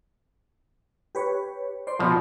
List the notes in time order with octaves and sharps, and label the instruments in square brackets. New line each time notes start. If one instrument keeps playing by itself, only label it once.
[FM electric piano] G4 B4 C#5
C5 D5 C6
[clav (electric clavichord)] B2 F3